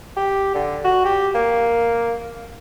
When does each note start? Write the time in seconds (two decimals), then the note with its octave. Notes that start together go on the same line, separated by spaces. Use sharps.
0.17 G4
0.54 D3
0.84 F#4
1.05 G4
1.35 A#3